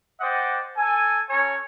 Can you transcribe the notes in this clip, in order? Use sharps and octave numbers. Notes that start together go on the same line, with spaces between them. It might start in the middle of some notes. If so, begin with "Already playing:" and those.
C5 D5 D#5 F#5 G5
A4 G#5
C#4 A4 C#5 G#5 A#5